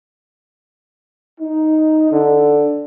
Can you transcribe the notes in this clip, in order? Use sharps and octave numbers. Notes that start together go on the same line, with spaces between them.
D#4
D3